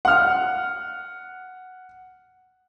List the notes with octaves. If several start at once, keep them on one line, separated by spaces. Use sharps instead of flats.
F#5 F6